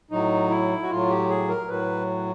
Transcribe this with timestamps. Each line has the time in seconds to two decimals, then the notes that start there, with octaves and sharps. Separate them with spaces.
0.10 A2 F#3 D#4
0.50 E4
0.82 F#4
0.90 A2 F#3 F4
1.10 G4
1.29 G#4
1.49 A#4
1.68 A2 F#3 B4